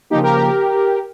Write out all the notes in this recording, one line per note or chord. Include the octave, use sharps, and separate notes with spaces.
C#3 F3 A#3 D#4 G4
G4 A#4
G4 A#4